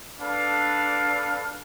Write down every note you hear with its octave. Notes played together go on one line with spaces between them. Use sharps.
D4 A4 B4 F5